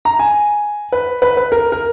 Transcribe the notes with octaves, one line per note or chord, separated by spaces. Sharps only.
A#5
G#5
B4
B4
B4
A#4
A#4